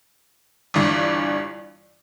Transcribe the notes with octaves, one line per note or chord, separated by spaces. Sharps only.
G1 G2 E3